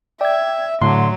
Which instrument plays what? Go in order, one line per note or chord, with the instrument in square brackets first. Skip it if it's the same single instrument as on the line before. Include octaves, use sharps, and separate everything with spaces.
[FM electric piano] D5 G#6 [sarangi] E5 [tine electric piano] G5
[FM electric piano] A2 [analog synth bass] D3 [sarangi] F#3 [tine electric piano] C6